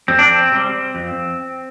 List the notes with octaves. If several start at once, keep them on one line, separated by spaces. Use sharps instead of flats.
F2 C4
D4
C4
C3 G3
F2